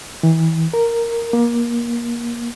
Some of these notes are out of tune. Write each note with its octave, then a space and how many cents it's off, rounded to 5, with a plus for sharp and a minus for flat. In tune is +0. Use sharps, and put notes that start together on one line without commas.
E3 -30
A#4 -5
A#3 +25